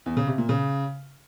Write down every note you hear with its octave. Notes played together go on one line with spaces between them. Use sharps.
E2
C#3
C3
A#2
C#3